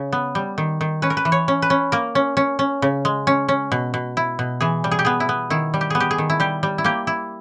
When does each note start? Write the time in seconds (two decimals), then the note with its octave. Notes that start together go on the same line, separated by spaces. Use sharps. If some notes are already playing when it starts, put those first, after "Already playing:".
Already playing: C#3
0.12 B3
0.35 G3
0.58 D#3
0.81 D#3
1.02 C#4 B4
1.10 A#4
1.17 B4
1.25 E3
1.32 C#5
1.48 C#4
1.62 B4
1.70 C#4
1.92 A#3 A#4
2.15 C#4
2.37 C#4
2.59 C#4
2.82 C#3
3.05 G#3
3.27 C#4
3.48 C#4
3.72 B2
3.94 B2
4.17 E4
4.39 B2
4.61 E3 G#4
4.84 G3
4.91 G#4
4.99 G4
5.05 B3 G#4
5.20 E4
5.29 B3
5.50 D#3 E4
5.74 G3
5.81 G4
5.90 B3 G#4
6.00 G4
6.11 G#4
6.18 D#3
6.30 E4
6.40 G3 G4
6.63 G3
6.78 E4
6.84 A#3 G4
7.07 E4